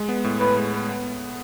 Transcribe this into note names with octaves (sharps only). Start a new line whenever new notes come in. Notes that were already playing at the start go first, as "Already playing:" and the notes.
Already playing: G#3
B3
A2
A2 B4
G#3
B3
B3